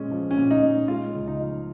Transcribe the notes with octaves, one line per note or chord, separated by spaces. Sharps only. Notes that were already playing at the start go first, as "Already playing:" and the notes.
Already playing: A#2 G#3 C#4
F3
C#4
A#2
D#4
A#2
G#3 F4
C#2
D#4
F3